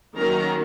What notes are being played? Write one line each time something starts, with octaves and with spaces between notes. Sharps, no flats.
D#3 F#3 A#3 C#4 A#4 A#5